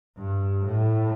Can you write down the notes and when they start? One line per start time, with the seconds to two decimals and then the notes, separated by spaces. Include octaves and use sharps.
0.18 G2
0.65 A2